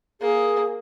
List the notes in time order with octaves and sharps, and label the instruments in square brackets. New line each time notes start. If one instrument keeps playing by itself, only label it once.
[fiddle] A#3 [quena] G#4